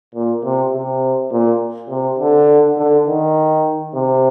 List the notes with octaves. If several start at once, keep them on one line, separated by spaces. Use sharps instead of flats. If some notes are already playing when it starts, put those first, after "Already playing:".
A#2
C3
C3
A#2
C3
D3
D3
D#3
C3